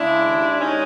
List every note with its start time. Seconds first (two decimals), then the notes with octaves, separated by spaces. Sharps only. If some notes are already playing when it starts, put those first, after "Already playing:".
Already playing: C#3 G#3 D4 E4
0.24 D#2
0.49 E4
0.60 G#3 C#4 D#4